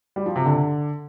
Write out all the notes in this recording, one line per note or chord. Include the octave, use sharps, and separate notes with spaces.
G3
F3
C3
D3